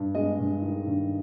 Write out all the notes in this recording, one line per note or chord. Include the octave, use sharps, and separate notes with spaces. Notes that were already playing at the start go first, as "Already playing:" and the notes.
Already playing: G2
G#3 D#5
G2
D#3
G2